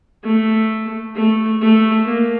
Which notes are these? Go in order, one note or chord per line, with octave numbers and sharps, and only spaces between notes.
A3
A3
A3
A#3